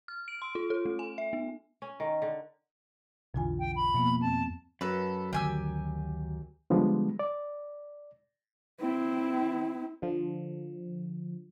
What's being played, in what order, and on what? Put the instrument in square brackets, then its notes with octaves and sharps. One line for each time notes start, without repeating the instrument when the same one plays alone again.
[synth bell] F6
D7
C6
F4
A4
A3
G#5
E5
B3
[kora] C#4
D#3
D3
[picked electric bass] B1 D3 E3 [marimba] F2 F4 G#5
[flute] G5
B5
[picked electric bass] B2 [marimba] F3 A#3 B3
[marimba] F2 C4 [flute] A5
[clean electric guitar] F#2 [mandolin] A4 B4
[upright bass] D2 [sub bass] D#3 [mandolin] G4 G#5 E6
[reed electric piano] D3 F3 G3 G#3 B3
D5
[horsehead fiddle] C4 E4
[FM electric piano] D3 F3